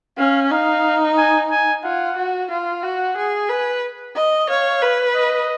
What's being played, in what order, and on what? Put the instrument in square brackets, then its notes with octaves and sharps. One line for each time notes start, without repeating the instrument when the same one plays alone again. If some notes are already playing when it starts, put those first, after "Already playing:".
[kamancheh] C#4 [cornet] F5
[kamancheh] D#4 [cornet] F5
[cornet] G#5
G#5
[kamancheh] F4 [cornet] F#5
[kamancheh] F#4
F4
[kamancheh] F#4 [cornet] F#5
[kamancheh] G#4
[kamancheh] B4 [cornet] G#5
[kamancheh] D#5
[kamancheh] C#5 [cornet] F5
[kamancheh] B4
[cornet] D#5